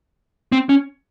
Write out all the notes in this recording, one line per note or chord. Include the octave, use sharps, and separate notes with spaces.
C4
C#4